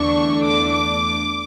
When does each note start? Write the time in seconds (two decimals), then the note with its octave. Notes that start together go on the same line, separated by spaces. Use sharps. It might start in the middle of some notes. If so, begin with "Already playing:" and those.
Already playing: E2 D3 A3 D4 C#6
0.44 D6
0.72 D6